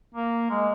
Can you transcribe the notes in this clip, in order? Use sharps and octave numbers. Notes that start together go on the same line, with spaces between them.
A#3
G#3